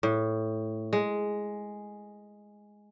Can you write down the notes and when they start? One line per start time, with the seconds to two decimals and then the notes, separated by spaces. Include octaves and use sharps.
0.03 A2
0.93 G#3